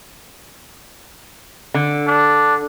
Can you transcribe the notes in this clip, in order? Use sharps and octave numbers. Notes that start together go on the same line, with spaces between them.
D3
D4